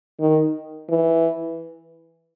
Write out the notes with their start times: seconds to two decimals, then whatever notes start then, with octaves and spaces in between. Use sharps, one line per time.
0.20 D#3
0.89 E3